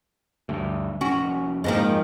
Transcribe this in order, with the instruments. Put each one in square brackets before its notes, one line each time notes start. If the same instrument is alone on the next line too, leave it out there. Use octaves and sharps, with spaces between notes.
[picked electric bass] D2 G2
[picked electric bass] F1 C#4 [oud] F#4
[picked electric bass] F2 G#2 A#3 [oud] D#3 F3 G#3